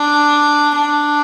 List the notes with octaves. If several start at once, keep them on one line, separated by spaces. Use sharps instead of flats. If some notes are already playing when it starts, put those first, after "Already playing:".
Already playing: D4
D4